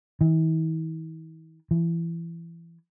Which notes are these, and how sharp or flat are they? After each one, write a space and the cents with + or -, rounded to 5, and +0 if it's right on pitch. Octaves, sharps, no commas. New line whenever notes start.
E3 -45
E3 +25